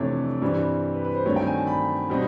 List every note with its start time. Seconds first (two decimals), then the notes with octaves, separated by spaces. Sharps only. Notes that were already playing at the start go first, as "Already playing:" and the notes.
Already playing: F2 C3 E3 A3 D4 C#5 D5
0.42 G2 E3 G3 C4
0.94 B4
1.05 B4
1.16 C5
1.26 G2 D#3 F#3 A3 C4 C#5
1.36 G5
1.47 G#5
1.57 A5
1.67 B5
2.09 B2 G3 C4 D#4